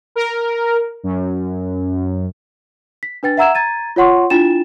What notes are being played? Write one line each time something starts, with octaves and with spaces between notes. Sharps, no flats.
A#4
F#2
B6
D4 B4 G5 A6
E5 F#5 A#5 E6 G#6 E7
A#5 G#6 A6 D#7
F4 C#5 F#5 C6 C#6
D4 E4 F4 G5 A6 E7